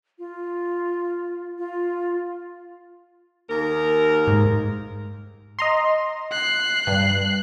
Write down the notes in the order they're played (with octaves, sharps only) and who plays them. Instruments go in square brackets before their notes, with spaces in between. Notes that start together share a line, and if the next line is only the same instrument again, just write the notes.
[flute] F4
F4
[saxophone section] D#2 A#4
[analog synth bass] G#2
[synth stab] D#5 A#5 C6
[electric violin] F#6 C7
[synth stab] G2